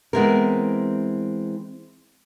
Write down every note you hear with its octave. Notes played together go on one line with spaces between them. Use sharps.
E3 G#3 B3 C4 E4 A#4